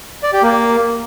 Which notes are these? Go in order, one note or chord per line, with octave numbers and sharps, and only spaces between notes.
D5
G4
A#3